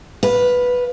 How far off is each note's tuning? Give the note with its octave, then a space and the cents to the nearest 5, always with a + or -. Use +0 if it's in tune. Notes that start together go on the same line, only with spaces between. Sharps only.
B4 +0 F5 +20